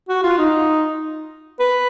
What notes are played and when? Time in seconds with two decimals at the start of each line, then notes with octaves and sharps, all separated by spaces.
0.09 F#4
0.23 F4
0.38 D#4
1.60 B4